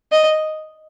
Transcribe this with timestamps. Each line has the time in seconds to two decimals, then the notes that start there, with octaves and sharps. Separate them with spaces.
0.12 D#5